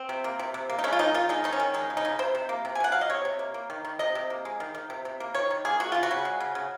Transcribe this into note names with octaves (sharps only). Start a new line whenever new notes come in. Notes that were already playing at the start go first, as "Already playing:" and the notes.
Already playing: C4
C3
A#3
C3
C3
A#3
D#4
G#3 C#4
F4
D#3 D#4
D#3 F4
G#3 D#4
D#3 D#4
C#4
D#3
G#3 D#4
C#3
D#4
C#3
C3 C5
C3
A#3
C3
G#5
C3 F#5
F#3 F5
D#5
C3 C#5
C3
A#3
A#3
D#3
D#3
C3 D#5
C3
A#3
G#3
D#3
D#3
C3
C3
A#3
D#3 C#5
D#3
A#3 G#4
G#3 F#4
C#3 F4
F#4
C#3
G#3
C#3
C#3